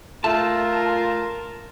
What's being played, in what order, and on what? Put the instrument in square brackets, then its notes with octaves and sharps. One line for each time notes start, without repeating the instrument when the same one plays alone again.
[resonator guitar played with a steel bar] A3 [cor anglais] F4 [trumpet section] A#4 [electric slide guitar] A5